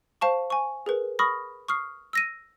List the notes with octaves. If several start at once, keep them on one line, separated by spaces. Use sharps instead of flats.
C5 F5 A5 C#6
G#5 C#6
G#4 A#4 B4
B5 C#6 D#6 F6 A#6
C#6 D#6 F6 C7
E6 A#6 D#7